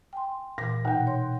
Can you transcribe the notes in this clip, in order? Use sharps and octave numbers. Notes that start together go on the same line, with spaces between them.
G5 G#5 C6
A#2 E3 A#6
B2 D#4 F#5 G5 A#5
C#5 C6